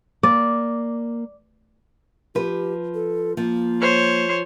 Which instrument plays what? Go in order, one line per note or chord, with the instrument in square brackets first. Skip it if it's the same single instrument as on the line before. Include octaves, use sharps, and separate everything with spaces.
[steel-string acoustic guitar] A#3 [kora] D5
[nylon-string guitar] F3 B4 [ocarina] G4
[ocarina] A4
[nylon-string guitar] F3 [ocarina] A#3
[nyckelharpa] C5 C#5